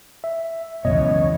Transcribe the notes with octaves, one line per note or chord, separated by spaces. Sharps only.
E5
C#2 F#2 B2 E3 C#5 D#5